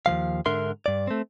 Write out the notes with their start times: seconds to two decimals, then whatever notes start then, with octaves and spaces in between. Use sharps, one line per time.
0.06 D#2 E3 F3 F5
0.46 G#2 D3 D4 A#4 E5 C6
0.86 G2 D5
1.07 A3 C4